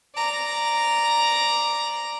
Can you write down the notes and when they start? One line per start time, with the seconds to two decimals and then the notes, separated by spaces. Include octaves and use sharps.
0.15 D5 A#5